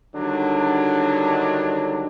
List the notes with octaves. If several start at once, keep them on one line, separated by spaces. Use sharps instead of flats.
D3 D#3 F#3 G3 D4